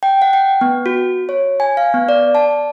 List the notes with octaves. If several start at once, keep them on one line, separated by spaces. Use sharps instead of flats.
G5
F#5
G5
B3
F#4
C#5
G#5
F5
B3
D5
A5